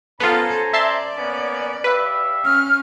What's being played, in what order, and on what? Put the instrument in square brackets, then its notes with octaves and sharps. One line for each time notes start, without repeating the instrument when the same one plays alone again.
[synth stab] B3 F4 [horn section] C#4 C5 A#5 [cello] A4
[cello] D5 [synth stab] E5 A5 C6
[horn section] A#3 B3 C#4
[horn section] G4 E5 F5 [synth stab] B4
[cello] C#4 [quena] F6